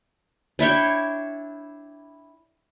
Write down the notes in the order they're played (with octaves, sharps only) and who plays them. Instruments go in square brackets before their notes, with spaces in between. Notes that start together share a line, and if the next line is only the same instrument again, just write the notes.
[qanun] D4 E4 C#5 G5